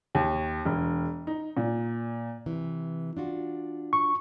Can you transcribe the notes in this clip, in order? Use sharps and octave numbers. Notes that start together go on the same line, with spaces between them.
D#2
E1
D#4
A#2
C3 E3
D4 F4 F#4
C#6